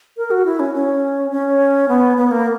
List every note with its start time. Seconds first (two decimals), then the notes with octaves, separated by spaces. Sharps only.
0.17 A#4
0.31 F#4
0.45 E4
0.60 C#4
0.74 C#4
1.31 C#4
1.88 B3
2.17 B3
2.31 A#3